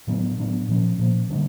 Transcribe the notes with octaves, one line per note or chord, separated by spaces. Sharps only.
A2 F#3 B3 D4
A2 F#3 B3 D4
A#2 F3 A#3 C#4
A#2 F3 A#3 C#4
D3 G3 A#3 D4